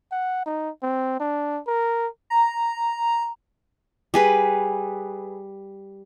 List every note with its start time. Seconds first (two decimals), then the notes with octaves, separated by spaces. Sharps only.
0.12 F#5
0.46 D#4
0.83 C4
1.20 D4
1.68 A#4
2.30 A#5
4.14 G3 G#4 B4